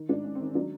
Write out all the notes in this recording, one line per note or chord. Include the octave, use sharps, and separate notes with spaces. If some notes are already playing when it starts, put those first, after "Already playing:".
Already playing: D#3
G#2 D4
G#2 C#4
C4
D#3
C#4
F#3 D4